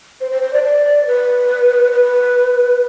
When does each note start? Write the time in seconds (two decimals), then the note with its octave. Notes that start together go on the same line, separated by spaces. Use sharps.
0.21 C5
0.31 C5
0.42 C5
0.53 D5
0.63 D5
1.06 B4
1.92 B4